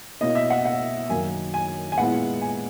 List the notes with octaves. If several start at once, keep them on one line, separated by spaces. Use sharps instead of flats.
B2 A#3 C#4 E4 D#5
E5
F#5
F#5
F#2 D#3 F#3 A#3 G#5
G#5
G#5
A#2 G#3 B3 E4 F#5
G#5